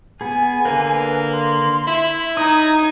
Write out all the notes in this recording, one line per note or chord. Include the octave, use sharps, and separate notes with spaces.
B3 G#4 G#5
D3 A#3 B4
C6
E4 E5
D#4 A#5 D#6 G#6